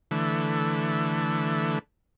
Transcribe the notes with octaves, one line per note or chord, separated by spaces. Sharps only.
D3 E3 A3